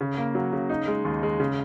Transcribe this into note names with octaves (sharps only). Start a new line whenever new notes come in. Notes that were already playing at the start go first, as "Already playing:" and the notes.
C#3
A#3
F#3
C#3
D#4
G#3
D#2
G#3
C#3